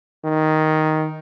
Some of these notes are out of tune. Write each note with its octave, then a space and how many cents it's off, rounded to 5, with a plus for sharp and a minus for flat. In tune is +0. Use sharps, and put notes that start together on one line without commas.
D#3 +5